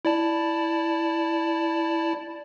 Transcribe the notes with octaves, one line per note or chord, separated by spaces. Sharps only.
E4 D5 A5